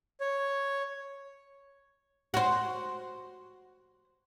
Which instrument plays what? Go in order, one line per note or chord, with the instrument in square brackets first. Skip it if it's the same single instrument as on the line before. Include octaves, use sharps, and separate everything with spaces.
[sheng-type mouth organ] C#5
[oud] F#4 C5